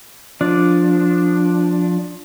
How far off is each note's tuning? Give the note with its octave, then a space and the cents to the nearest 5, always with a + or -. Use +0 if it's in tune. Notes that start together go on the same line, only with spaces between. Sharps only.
F3 +15 D4 +0 D5 +0